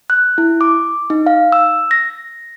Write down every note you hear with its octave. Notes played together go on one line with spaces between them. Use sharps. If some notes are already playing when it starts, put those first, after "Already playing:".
F#6
E4
D6
D#4
F5
E6
A#6